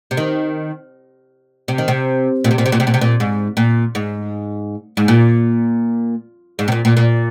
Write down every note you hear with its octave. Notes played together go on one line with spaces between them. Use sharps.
C3
D#3
C3
D#3
C3
A#2
C3
A#2
C3
A#2
C3
A#2
C3
A#2
G#2
A#2
G#2
G#2
A#2
G#2
C3
A#2
A#2
A#2